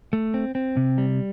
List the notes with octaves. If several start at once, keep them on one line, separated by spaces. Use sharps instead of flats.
A3
C4
C4
C3
G3